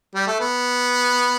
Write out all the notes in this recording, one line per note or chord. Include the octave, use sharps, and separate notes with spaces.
G3
A3
B3